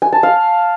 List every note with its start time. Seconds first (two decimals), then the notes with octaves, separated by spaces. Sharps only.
0.02 G#5
0.13 A5
0.23 F5